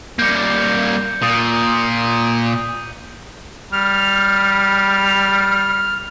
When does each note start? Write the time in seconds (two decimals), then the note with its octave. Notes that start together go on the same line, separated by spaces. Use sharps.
0.19 G3 A#3 G6 C#7
1.22 A#2 D#6 D#7
3.73 G3 F6